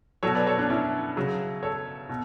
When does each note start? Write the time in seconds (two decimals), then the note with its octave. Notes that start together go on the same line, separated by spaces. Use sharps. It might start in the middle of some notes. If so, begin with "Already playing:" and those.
0.23 B2 F#3 A4 C#5
0.35 B4 D5
0.46 A4 C#5
0.58 B3 D4
0.70 C#4 E4
1.17 C#3 F#3
1.63 A4 C#5
2.09 B2